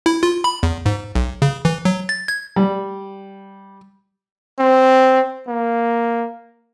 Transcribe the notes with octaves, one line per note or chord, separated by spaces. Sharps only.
E4
F4
B5
E2
G#2
B1
C#3
E3
F#3
A6
G#6
G3
C4
A#3